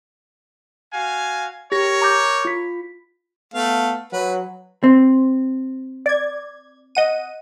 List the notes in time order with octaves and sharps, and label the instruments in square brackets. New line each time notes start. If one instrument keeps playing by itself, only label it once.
[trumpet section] F#4 F5 G#5
[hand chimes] G4 A#6 [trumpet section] A#4 C#5
[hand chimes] A#5 D6 G6
F4 B6
[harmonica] A3 F5 [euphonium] B3
[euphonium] F#3 [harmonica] B4
[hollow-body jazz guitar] C4
[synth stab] D5 G#6
D#5 F#5 D#7